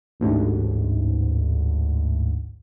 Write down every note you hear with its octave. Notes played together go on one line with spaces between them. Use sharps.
A1 D2 G#2